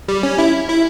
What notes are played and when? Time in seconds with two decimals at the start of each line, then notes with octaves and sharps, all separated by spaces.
0.08 G3
0.23 C#4
0.38 E4
0.68 E4